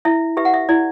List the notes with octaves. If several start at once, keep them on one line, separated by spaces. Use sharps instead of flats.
E4 E5
G4 B4 E5
F#5
E5
E4 D5